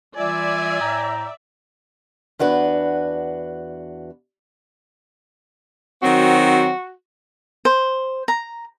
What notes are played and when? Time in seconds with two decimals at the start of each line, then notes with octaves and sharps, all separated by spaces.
0.17 E3 G3 F4 D5 E5 G#5
0.80 A2 G5 A#5
2.39 E2 D4 F#4 B4
6.02 D#3 F#3 C4 F#4
7.65 C5
8.28 A#5